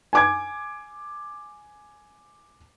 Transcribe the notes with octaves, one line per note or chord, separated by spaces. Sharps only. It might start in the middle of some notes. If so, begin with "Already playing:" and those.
G#5 D6 G#6